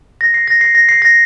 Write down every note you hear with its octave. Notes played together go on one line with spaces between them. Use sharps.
A#6
C7
A#6
C7
A#6
C7
A#6